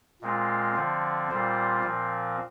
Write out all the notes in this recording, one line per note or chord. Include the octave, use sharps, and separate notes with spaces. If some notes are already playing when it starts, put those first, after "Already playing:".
A#2 G#3 C4 F4
D3 F3 C4
A#2 G3 C4 F4 C5
A#2 F3 C4